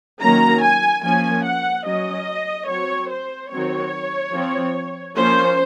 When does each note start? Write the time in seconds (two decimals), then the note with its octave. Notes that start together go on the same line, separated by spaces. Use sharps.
0.21 D#3 F#3 A#3 C#4 A#5
0.63 G#5
1.03 F3 A#3 C#4 G#5
1.45 F#5
1.86 F#3 C#4 D#5
2.68 F#3 C4 C#5
3.09 C5
3.50 D#3 F#3 C4 C#5
4.33 F3 C4
5.15 F3 A#3 C#4 C5